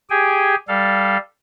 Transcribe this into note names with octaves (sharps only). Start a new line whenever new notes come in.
G4 G#4 G5 G#5
G3 A4 F5